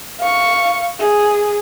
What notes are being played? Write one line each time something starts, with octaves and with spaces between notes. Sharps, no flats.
F5 C#6
G#4